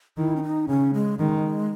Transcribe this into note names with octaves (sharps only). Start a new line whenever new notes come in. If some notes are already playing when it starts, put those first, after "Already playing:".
D#3 E4
C#4
D#4
C#3 C#4
G#3
D#3 G#3